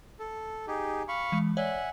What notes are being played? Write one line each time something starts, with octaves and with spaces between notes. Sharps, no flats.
A4
D#4 G4 G#4
F5 B5 C#6
E3 G#3
C#5 D5 E5 F#5 G#5